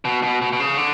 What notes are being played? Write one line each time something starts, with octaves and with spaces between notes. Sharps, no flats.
B2
B2
B2
B2
C#3
D3